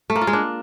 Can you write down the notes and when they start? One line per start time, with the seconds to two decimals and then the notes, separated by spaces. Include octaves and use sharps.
0.10 A3
0.16 A#3
0.21 F4
0.27 G#3
0.33 D4